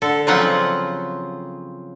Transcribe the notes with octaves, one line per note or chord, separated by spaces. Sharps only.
D3 A4
C#3 F3 F#3 C4 F4 F#5